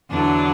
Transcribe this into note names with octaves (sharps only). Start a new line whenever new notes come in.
E2 D3 F#3 D4